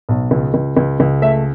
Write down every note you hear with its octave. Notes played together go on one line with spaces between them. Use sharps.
B1
C#2
C#2
C#2
C#2
A3 E5